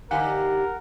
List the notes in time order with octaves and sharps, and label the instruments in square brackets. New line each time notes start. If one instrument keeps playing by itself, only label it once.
[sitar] D3 D#4 G4 [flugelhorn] A#4 [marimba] F5 G#5 [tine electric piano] F#5